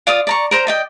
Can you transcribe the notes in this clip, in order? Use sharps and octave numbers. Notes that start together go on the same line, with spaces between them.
F4 D5 F5 D#6
D5 A#5 C#6
A#4 C5 A#5
D5 D#5 G5